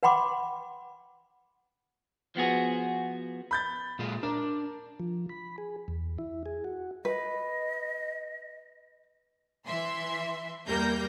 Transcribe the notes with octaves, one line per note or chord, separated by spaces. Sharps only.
B4 F#5 G5 B5 C6 D6
F3 B3 F#4 G#4
B5 G6 A6
A#2 G#3 F4
D4 A#4
F3
B5
G#4
E2
E4
G#4
F#4
B4 D#5
E3 E5 C6
E2 G3 A#3 A#4 G6 A#6